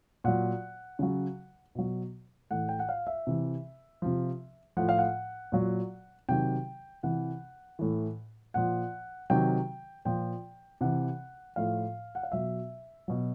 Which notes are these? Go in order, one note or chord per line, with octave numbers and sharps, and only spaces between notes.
A#2 F#3 F#5
C#3 F#3
B2 F#3
A2 E3 F#5
G5
F#5
F5
E5
C3 E3
C3 F3
A2 F3 F#5
F5
F#5
A#2 F#3
C3 D#3 F#3 G5
C3 E3 F#5
A2 E3
A#2 F3 F#5
C3 D#3 F#3 G5
A#2 F3 G5
C3 E3 F#5
A2 F3 F5
F#5
F5
B2 F#3 E5
B2 F#3